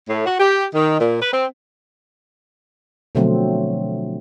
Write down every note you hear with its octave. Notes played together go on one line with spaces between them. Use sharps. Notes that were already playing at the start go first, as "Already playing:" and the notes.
A2
F#4
G4
D#3
A#2
B4
C4
B2 D3 F3 F#3 A3 C4